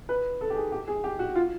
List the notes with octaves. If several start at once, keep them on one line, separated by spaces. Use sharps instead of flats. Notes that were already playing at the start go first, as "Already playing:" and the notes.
B4
A4
G4
G#4
G4
G#4
G4
F#4
F4